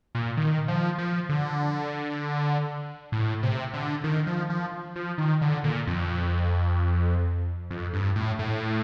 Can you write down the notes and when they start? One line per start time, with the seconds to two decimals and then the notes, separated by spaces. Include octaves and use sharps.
0.15 A#2
0.37 D#3
0.68 F3
0.98 F3
1.29 D3
3.12 A2
3.43 C3
3.74 D3
4.04 D#3
4.27 F3
4.50 F3
4.96 F3
5.18 D#3
5.42 D3
5.64 A#2
5.87 F2
7.71 F2
7.94 G2
8.16 A2
8.39 A2